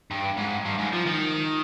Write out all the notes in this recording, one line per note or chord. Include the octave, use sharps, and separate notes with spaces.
G2
G#2
G2
G#2
F3
D#3